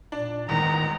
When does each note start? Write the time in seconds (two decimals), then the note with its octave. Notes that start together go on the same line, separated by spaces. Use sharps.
0.12 A#2 D4
0.49 A1 E2 G#2 D#3 A#5